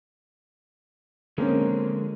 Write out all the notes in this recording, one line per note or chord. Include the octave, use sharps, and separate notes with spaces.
D3 F3 G#3 A#3 C4 C#4